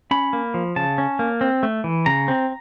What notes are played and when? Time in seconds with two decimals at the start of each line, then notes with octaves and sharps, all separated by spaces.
0.11 C#4 B5
0.33 A#3
0.54 F3
0.76 C#3 A5
0.98 C#4
1.19 A#3
1.41 C4
1.63 A3
1.84 E3
2.06 C#3 A#5
2.28 C4